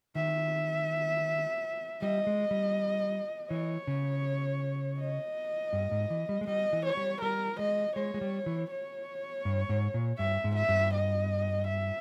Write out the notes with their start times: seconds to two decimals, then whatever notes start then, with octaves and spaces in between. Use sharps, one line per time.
0.15 D#3 E5
2.02 G3 D#5
2.27 G#3
2.51 G3
3.50 E3 C#5
3.87 C#3
5.00 D#5
5.73 G2
5.91 G#2
6.10 E3
6.29 G3
6.41 G#3
6.47 G3 D#5
6.73 E3
6.85 C#5
6.97 G3
7.21 G3 A#4
7.59 G#3 D#5
7.96 G#3 C#5
8.14 G#3
8.21 G3
8.46 E3
8.71 C#5
9.45 G2
9.69 G#2
9.94 A#2
10.18 G2 E5
10.44 G#2
10.56 E5
10.69 G2
10.94 D#5
11.67 E5